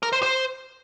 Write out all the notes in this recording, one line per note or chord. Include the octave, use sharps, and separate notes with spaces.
A#4
C5
C5